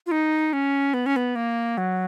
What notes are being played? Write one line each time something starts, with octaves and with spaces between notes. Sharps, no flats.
F4
D#4
C#4
B3
C#4
B3
A#3
F#3